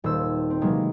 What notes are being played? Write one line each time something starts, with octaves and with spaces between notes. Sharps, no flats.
D#1 C5 E6
C4
C3 E3 F#3 G#3 A#3